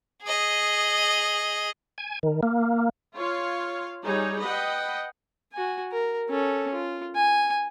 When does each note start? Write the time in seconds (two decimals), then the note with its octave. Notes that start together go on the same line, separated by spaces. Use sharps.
0.23 G#4 D#5
1.98 G#5
2.23 D#3
2.43 A#3
3.16 F4 C#5 F5
4.04 G3 D#4 G#4 C#5
4.43 B4 D#5 F#5 G5
5.53 F#4 G#5
5.92 A#4
6.30 C#4 A4
6.74 F4
7.15 G#5